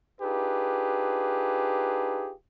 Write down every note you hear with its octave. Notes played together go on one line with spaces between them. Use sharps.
D4 D#4 F4 G4 G#4 B4